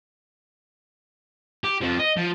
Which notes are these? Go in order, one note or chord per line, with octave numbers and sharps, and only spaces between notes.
G4
F2 F3
D#5
F3